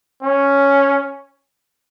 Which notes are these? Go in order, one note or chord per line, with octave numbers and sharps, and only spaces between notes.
C#4